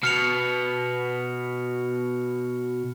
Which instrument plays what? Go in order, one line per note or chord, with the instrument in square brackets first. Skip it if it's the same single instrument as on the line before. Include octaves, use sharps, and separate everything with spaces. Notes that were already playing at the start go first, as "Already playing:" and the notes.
[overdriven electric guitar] B2 [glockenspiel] F6 C#7 F7